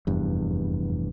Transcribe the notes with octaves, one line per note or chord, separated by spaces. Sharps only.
F1 E2 G2